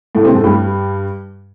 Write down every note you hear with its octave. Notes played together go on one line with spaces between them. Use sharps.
A2 A3
C3 C4
A2 A3
G2 G3